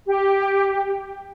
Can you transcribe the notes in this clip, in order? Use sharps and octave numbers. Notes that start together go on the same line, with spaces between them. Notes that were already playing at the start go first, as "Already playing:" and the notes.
G4